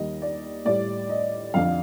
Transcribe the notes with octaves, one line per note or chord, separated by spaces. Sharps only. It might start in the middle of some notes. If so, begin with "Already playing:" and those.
Already playing: D#2 D#3 G3 D#5
D5
A2 G3 D5
D#5
F2 D3 F3 F5